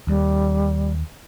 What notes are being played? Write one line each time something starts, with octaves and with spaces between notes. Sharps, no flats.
D#2 G3